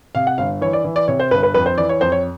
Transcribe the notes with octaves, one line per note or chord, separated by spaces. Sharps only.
C3 F5
F#5
G1 F5
E3 C#5
D5
E3
D5
C3 C#5
C5
G1 B4
B4
F2 B4
C5
E3 D5
C#5
F2 C5
C#5